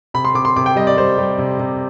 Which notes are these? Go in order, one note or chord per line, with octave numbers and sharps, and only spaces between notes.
C3 B5
C6
C3 D6
C6
C3 D6
G5
G3 D#5
D5
G3 C5
G3
C3
C3